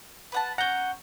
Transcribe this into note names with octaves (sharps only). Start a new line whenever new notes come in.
B4 F#5 A5
C#4 F#5 A#5 G6